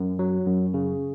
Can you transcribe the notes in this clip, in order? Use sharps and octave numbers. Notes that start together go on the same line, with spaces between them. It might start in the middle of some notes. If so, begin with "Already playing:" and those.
Already playing: F#2
F#3
F#2
C#3